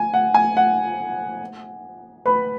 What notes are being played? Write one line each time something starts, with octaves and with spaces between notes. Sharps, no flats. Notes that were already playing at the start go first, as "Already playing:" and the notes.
Already playing: G#5
F#5
G#5
F#5
B4 B5